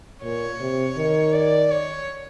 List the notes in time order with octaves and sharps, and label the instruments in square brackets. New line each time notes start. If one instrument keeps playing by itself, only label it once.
[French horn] A#2 [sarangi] C#5
[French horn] C3
D#3
[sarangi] D5
C#5